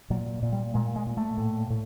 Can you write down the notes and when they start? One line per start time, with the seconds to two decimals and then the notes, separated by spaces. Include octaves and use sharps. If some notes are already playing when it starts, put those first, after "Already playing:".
0.10 A#2 F#3
0.43 A#2
0.52 G3
0.74 A#2 G#3
0.96 G#3
1.07 A#2
1.17 A3
1.38 A2
1.70 A2